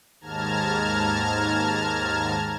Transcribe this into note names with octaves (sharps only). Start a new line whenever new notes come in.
D#2 G#2 A5 A#5 F6 G#6